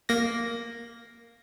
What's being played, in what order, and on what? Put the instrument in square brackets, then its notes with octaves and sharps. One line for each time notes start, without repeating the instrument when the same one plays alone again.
[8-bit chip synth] A#3 A#6